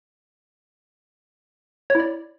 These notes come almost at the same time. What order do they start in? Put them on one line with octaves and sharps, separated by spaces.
C#5 E4 D5